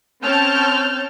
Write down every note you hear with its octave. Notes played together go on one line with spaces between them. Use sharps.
C4 C#4 C#5 A5 F6 G6